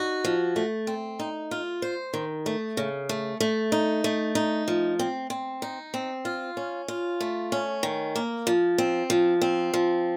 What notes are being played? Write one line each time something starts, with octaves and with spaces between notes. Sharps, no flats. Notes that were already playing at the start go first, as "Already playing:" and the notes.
Already playing: D#4 F#4
F3
A3
C4
D#4
F4
C5
D#3
A3
C#3
A3
A3
D#4
A3
D#4
F3
C4
C4
D#4
C4
F4
C#4
F4
A3
C#4
D#3
A#3
F3
C4
F3
C4
F3